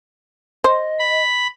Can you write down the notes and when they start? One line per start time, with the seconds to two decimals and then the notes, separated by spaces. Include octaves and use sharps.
0.64 C5 D#5
0.99 B5